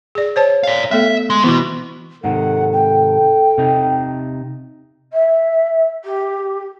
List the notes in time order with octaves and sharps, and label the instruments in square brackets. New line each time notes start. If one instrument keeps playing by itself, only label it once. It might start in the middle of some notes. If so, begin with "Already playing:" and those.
[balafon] G#4 D5
C5 C#5 A5
[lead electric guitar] D5 F5
[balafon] A3 B3 A4 [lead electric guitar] E5
[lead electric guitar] G#3 C6
[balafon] E3 E4 D6 [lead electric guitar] B3 F#4
[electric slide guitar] G#2 C3 D#3 [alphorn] A4 [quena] F#5
[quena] G5
[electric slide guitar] C3 D#4
[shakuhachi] E5
G4